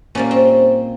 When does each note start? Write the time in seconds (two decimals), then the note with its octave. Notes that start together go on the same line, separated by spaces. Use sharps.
0.15 A#2 G3 A#3 C#4
0.31 C4